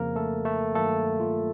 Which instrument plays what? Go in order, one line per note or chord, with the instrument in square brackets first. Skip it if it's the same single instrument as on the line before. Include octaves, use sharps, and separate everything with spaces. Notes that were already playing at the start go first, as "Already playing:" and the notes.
Already playing: [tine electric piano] F2 C#3 F3 A#3 A#4
A3 A4
A3 A4
G2 D#3 F#3 A3 A#3 A4
F4